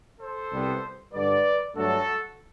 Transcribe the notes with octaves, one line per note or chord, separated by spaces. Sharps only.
A4 C5
C2 C3 G3 B3
G2 D3 G3 B4 D5
G2 F#3 A3 D4 F#4 A4